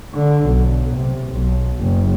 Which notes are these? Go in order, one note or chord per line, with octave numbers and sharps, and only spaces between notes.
D3
B1
C3
B1
F#1